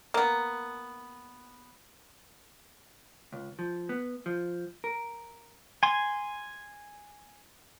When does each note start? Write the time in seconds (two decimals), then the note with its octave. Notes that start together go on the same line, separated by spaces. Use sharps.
0.14 A#3 B3
3.32 C#2
3.59 F3
3.89 B3
4.26 F3
4.84 A#4
5.83 G#5 C6